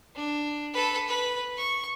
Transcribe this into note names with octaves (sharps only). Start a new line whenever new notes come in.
D4
A4 B4
B4
C#6